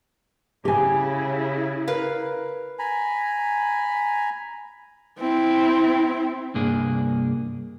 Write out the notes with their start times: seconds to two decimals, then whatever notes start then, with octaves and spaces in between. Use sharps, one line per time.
0.65 C#3 E4 G4 G#5
1.88 A#4 B4 F5
2.79 G#5 A#5 B5
5.19 C4 E4
6.54 C2 G2 A#3 D4 G#4